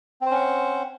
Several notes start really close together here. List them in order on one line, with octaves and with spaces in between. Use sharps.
C4 C5 C#4 F#5